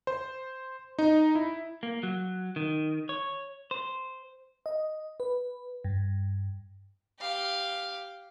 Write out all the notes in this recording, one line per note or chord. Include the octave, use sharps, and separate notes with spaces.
C5
D#4
E4
A#3
F#3
D#3
C#5
C5
D#5
B4
G2
G4 F5